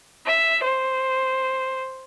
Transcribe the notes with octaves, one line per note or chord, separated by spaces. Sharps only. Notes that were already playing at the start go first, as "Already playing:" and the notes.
E5
C5